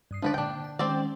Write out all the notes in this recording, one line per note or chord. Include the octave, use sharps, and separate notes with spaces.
G2 D#6 C7
D3 F3 G#3 D4 B4 D5
A#2 D3 D4 G5
A5
D#3 G#3 C4 C#4 C5 D5